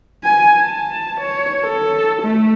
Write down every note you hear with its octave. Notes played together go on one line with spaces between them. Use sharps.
G#5
A5
C#5
A4
A3